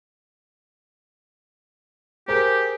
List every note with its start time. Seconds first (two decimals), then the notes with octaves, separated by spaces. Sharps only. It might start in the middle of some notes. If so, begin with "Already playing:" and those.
2.28 G4 G#4 A#4 C5